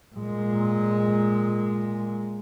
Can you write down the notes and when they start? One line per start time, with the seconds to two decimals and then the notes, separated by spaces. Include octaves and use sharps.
0.16 A#2 G#3